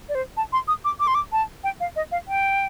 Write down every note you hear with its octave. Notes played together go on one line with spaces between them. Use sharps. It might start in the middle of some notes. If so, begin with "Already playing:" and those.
D5
C5
A5
C6
D#6
D6
D6
C6
D6
A5
G5
F5
D#5
F5
G5